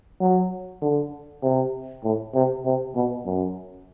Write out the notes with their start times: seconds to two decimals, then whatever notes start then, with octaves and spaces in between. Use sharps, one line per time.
0.21 F#3
0.82 D3
1.43 C3
2.04 A2
2.34 C3
2.65 C3
2.95 B2
3.26 F#2